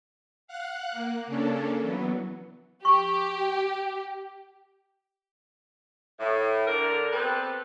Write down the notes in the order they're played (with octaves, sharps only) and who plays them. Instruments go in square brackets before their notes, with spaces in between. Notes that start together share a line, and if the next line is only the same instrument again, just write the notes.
[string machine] F5 F#5 F#6
A#3
C#3 A#3 C#4 D4 A4
E3 F#3 B3
[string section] G4 [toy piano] C#6
[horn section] A2
D3 A#4
B3 C4 G4 A4 B4